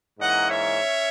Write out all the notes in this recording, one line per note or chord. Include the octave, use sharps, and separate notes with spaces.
G#2 E3 A#3 C#4 D#5 F#5
C#5 E5
C#4